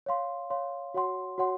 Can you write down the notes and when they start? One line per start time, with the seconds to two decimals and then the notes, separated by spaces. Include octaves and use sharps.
0.06 C#5 F5 C6
0.50 C#5 F5 C6
0.94 F#4 C#5 F#5 C6
1.38 F#4 C#5 F#5 C6